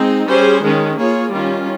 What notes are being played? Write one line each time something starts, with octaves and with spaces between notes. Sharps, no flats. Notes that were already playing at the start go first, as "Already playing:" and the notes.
Already playing: G#3 C4 D#4
G3 C#4 G#4 C5
D#3 G#3 C#4 G#4
A#3 F4 G#4 C#5
D#3 G3 C#4 F4